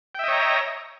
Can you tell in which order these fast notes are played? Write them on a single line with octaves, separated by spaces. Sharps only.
G5 E5 D#5 C#5 A#5